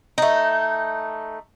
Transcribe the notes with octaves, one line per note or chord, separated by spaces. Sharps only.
A3 D#4